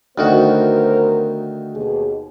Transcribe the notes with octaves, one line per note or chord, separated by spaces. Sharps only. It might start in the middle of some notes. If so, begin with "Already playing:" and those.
D2 D#3 B3 F#4 A#4 C5
D#2 B2 G#4